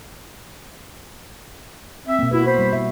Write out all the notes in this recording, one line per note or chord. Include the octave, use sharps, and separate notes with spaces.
C4 E5
B2 A#3
E4 F#4 B4
C5 B5
G3
E5